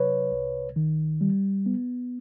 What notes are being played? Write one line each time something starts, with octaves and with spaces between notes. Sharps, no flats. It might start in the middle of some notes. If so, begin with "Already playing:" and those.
Already playing: C3 F#3 B4 C#5
C2
D#3
G3
B3